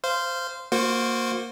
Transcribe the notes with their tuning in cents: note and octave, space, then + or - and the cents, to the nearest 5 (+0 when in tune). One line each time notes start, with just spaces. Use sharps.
C5 -10 F5 -15
A#3 +0 F#4 -30 C5 +0